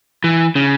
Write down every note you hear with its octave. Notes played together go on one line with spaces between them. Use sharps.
E3
C#3